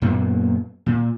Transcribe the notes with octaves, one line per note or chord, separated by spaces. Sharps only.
F#2 A#2 A#3 B3
A#2